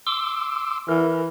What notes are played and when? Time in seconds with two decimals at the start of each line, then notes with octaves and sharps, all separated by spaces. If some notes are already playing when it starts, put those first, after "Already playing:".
0.07 C6 D6 E6
0.89 E3 A#4